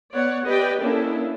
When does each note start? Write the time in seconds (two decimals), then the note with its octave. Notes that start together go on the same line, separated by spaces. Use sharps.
0.12 B3 C#5 D5 F#5
0.45 G4 B4 D5 D#5 G5
0.81 A#3 C#4 D4 E4 A4